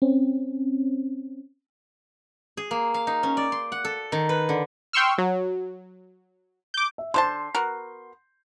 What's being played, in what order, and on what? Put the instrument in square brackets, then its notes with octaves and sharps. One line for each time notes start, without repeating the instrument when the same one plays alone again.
[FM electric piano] C4 C#4
[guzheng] G#4
A#3
F5
D#4
C#4
D5
C6
F#5
A4
D#3
B4
D3
[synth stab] G5 C6 C#6 E6 F6
F#3
D6 G6
[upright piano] E5
[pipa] D3 C5 A5 [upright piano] C6 G6
[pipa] B3 F#4 A#4